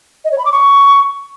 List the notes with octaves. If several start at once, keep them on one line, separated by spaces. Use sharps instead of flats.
D#5
C#5
B5
D6
C#6